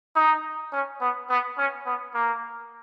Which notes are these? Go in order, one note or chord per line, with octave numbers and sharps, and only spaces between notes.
D#4
C#4
B3
B3
C#4
B3
A#3